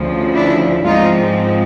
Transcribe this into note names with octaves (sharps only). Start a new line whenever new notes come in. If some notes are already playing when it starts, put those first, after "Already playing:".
Already playing: D2 C#3 F3
D4 E4
G#2 F3 G#3 C4 D#4 F4